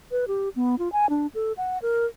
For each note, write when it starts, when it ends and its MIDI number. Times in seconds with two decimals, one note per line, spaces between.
0.11 0.25 71
0.28 0.49 67
0.56 0.78 59
0.79 0.91 65
0.92 1.09 80
1.10 1.27 62
1.35 1.52 69
1.57 1.78 78
1.82 2.06 70